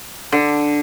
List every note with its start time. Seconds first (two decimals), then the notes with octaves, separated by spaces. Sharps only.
0.32 D3